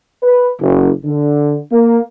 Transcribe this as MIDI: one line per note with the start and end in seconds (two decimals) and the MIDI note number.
0.23 0.48 71
0.60 0.88 30
1.05 1.56 50
1.72 1.99 58